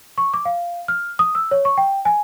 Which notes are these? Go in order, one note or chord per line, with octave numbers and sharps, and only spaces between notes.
C#6
D6
F5
F6
D#6
E6
C#5
C#6
G5
G#5